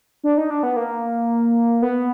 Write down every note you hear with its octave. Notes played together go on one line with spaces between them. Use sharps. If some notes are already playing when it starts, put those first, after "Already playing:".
D4
D#4
D4
B3
A#3
B3